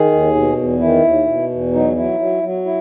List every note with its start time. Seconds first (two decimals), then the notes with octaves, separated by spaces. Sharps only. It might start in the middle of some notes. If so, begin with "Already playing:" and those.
Already playing: D#3 G#4
0.12 D#2
0.35 B2
0.58 E2
0.80 D#3 E4
1.04 D#2
1.27 B2
1.50 E2
1.73 F#3 D#4
1.96 F#3 E4
2.20 F#3
2.43 F#3
2.65 E4